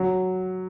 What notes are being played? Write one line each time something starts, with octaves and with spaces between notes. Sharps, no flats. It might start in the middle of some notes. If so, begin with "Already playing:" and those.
Already playing: F#3